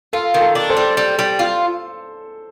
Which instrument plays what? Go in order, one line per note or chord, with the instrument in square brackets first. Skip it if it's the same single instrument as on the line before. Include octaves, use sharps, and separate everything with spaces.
[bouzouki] F4 [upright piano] A4
[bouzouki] D#3
[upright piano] A4
[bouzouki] D4
[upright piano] A4 C5
[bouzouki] G3
G3
G3
F4